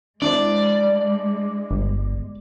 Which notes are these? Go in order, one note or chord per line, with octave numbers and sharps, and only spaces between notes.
G#3 D4 E4 C5 D5
G1